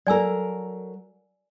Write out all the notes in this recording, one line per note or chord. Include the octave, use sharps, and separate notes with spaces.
F#3 A4 A#4 D5 G#5 E6